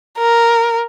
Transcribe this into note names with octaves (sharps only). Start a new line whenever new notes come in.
A#4